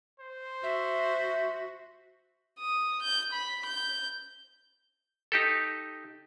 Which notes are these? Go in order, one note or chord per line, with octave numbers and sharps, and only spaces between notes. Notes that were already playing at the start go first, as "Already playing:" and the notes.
C5
F#4 E5
D#6
G6
B5
G6
D#4 G4 A4